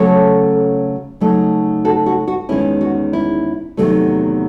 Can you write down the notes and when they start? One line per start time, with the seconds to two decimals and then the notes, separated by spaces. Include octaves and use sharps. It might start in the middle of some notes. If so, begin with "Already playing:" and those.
Already playing: C#3 F#3 A3 C#4 A4 C#5
1.20 C#3 F#3 A3 D#4
1.85 F#4 A4
2.06 F#4
2.28 F#4
2.49 E2 D#3 G#3 C#4 E4
2.81 F#4
3.13 E4
3.77 E2 C3 D#3 F#3 A3